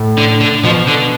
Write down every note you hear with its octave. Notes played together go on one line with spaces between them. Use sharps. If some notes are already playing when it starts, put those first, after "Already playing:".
Already playing: A2
D3
D3
B2 F3
D3